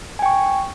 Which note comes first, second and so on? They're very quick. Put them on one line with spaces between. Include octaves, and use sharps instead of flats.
G#5 G5 C#6